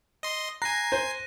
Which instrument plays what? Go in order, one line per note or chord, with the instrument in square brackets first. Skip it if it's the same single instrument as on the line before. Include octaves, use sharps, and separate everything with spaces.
[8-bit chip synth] D#5 C6
[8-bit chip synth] G#5 C7 [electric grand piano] A#5 [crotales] F#6 A#6
[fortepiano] C5 [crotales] D#7